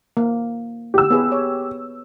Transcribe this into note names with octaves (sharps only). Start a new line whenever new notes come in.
A#3
G4 E6
B3 G#4 B4
C#5